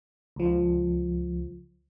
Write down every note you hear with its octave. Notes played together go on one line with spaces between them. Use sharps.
C#2 F3